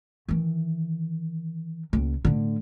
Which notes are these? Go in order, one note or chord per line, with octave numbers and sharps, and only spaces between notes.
D#3 E3
C#2 A#3
A2 D3